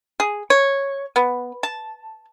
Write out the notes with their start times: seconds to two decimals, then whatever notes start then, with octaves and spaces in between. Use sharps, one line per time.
0.20 G#4
0.50 C#5
1.16 B3
1.63 A5